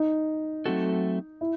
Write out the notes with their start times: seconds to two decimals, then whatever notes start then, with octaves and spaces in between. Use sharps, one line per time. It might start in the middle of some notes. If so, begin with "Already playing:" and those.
Already playing: D#4
0.66 F#3 A3 C4 F#4 A4
1.41 E4